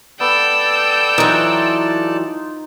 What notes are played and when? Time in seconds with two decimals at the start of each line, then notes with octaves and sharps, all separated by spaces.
0.20 B3 A4 D5 G5 A5 E6
1.18 E3 F#3 D#4 F4 A#4